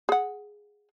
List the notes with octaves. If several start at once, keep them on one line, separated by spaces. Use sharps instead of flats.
G#4 F#5